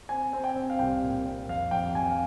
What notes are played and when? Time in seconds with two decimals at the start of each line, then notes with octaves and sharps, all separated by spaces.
0.09 C4 G#5
0.33 C4
0.44 G5
0.56 C4
0.70 F5
0.79 C2 G5
1.03 A#2
1.26 C4
1.48 F2 F5
1.71 F2 G5
1.95 F2 G#5
2.11 F5